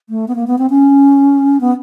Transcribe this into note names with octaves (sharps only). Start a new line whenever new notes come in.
A3
B3
A#3
B3
C4
C#4
B3